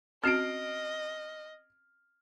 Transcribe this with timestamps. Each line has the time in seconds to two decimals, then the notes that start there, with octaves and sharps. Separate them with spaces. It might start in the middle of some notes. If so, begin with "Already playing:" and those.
0.24 C4 C#4 F#4 D#5 F6 C7 D7